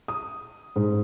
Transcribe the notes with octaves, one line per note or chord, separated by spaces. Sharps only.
D#6
G#2